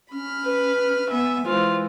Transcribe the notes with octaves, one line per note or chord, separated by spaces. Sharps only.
C#4 B5 F6
B4
B3 E5 G#5
E3 G#3 F4 C5